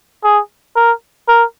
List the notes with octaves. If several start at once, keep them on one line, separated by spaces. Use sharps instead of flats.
G#4
A#4
A#4